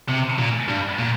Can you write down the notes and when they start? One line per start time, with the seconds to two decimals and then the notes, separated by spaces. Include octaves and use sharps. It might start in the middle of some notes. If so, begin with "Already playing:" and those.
0.09 C3
0.39 A#2
0.69 G2
0.99 A#2